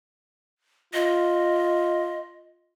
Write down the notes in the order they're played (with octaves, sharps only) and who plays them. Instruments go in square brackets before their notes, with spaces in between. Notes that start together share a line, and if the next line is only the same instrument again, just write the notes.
[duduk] F4 [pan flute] D#5